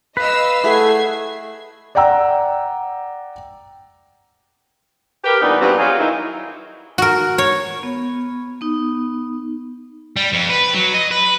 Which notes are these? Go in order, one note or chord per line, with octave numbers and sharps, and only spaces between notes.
B4 D#5 F5 E6
A3 E4 G#4 F#5 G#6 C7
D5 F#5 G5 A#5 E6
G4 A#4 B4
A#2 E3 G3 B3 D4 D#4
G2 F#3 G3 B3 C4 F4
F#3 F4 G#4
D#3 D#4 E4
F#4 A#4
C#5
B3
B3 D#4
G3
F2
B4
F#3
D#5
B4